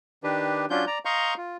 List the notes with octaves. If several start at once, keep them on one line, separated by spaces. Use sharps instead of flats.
D#3 D4 G4 B4
F#3 C#4 D4 F4 G6
D5 A#5
D#5 F5 A#5 C6 C#6 G6
F4